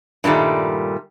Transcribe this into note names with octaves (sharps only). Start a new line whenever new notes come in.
G2 A#2 D#3 G3 A3